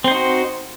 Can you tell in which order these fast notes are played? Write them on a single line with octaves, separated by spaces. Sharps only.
C4 C5 D#4 F#4